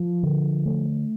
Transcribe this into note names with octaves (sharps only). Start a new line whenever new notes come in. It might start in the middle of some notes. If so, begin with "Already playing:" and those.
Already playing: F3
D3
A3